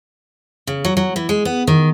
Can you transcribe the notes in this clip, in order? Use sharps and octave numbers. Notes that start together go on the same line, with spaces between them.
C#3
F#3
F#3
E3
G#3
B3
D#3